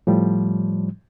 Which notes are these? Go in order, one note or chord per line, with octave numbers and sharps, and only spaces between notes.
A2 F3 G3